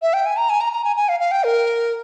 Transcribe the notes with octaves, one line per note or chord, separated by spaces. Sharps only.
E5
G5
G#5
A#5
G#5
A#5
A#5
G#5
G#5
F5
F5
G5
A#4